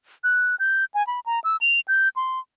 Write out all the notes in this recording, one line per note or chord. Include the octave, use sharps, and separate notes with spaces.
F#6
G6
G#5
B5
A#5
E6
F7
G6
C6